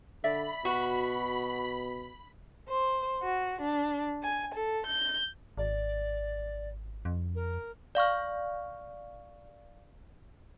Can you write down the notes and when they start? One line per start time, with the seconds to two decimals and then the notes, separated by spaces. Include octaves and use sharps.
0.24 D3 D5 E5 B5
0.65 B2 F#4
2.68 C5
3.21 F#4
3.60 D4
4.22 G#5
4.53 A4
4.85 G6
5.58 G#1 D5
7.05 F2
7.35 A#4
7.95 D5 F5 C#6 F6